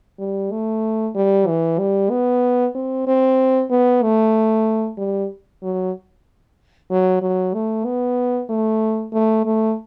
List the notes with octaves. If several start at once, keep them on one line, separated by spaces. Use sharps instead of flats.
G3
A3
G3
E3
G3
B3
C4
C4
B3
A3
G3
F#3
F#3
F#3
A3
B3
A3
A3
A3